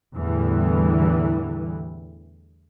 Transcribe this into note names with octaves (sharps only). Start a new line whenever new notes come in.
E2 A2 D3 E3 G3